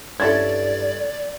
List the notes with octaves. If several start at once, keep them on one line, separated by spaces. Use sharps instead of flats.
G2 C#4 E4 A4 D5 G#6 A6